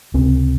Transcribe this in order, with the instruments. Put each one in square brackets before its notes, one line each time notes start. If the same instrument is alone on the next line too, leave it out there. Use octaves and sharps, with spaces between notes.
[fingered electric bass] C#2 C3 C4